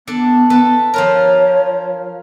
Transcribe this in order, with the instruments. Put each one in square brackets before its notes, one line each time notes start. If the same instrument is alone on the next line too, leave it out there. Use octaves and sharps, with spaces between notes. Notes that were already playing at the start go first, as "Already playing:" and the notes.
[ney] B3 [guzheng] D4 A4
[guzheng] A4 B4
[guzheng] F3 F4 A#4 [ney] C#5